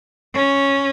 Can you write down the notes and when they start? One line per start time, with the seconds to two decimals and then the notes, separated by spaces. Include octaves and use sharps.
0.34 C#4